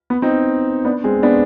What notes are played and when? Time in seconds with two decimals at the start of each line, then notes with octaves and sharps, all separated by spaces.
0.10 B3
0.22 C4 D#4
0.85 B3 D4
1.04 G#3 C4
1.23 B3 D4